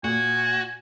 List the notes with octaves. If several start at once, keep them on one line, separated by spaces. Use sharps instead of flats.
A#2 F#4 G#5